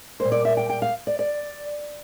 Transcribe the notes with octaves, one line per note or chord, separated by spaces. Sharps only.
A#2 G3 A#3 C5
D5
E5
G5
G5
F5
D5
D5